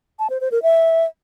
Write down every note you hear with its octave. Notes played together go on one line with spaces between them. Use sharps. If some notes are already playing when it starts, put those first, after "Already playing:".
A5
C5
C5
A#4
E5